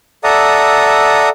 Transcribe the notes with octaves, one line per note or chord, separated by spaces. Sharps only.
A4 D5 E5 F#5 A#5 D#6